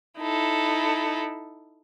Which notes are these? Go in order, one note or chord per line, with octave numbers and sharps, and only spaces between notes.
D#4 E4 A4